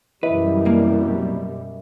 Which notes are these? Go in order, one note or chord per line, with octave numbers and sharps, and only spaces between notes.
F#2 B2 E3 G3 B4 D#5 E5
C2 A#3